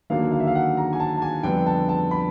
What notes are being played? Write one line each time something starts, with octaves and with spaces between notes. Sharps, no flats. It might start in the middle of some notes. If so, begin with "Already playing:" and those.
D#2 D3 F#3 A#3 F5
F5
E5
F5
F#5
A#5
G#5
A5
A5
G#5
F2 D3 G3 B3 G5
A5
A5
B5